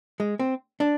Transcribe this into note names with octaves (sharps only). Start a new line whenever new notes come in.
G#3
C4
D4